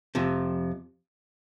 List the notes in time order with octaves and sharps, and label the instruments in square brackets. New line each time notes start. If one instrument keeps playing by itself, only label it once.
[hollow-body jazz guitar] F2 C3 F3